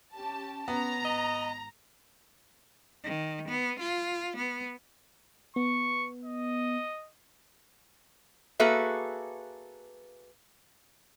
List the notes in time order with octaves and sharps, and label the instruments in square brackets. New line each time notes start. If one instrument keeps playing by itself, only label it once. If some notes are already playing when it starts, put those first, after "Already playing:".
[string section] C#4 G4 A5
[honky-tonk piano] B3 [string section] C#4 [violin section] A#5
[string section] G#1 [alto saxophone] D#5
[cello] D#3
B3
F4
B3
[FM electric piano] B3 [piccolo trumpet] C#6
[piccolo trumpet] D#5
[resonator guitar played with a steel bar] A#3 F#4 G#4 A4 B4 E5